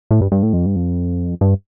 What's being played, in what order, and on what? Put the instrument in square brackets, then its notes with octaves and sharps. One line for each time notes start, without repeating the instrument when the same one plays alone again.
[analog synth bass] A2
G2
G2
A2
F2
G2
F2
G2